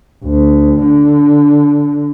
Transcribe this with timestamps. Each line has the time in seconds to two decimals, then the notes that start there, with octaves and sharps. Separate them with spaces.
0.25 D2
0.81 D3